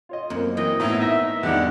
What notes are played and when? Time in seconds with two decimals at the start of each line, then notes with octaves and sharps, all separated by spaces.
0.09 F4 C#5 D#5
0.30 F#2 A#3 C4
0.57 E3 D#5 G5
0.80 A2 B3 D#4 E4
0.99 D#4 E5 A#6
1.43 E2 D#3 G3 D4 D#4 D5 F#5